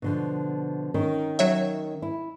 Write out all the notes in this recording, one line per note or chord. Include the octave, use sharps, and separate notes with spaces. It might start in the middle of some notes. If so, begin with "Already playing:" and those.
B2 D3 F3
D#3 C#4 A#4
F#3 C#5 E5
E4